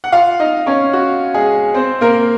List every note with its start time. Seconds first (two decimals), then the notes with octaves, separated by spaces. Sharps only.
0.04 F#5
0.12 F4 F5
0.40 D#4 D#5
0.66 C#4 C#5
0.93 F#4
1.34 G#3 G#4
1.74 C4 C5
2.01 A#3 A#4